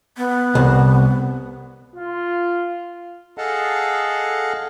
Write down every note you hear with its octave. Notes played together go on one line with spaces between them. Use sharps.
B3
C2
F4
G#4 A4 D#5 F5 F#5 A5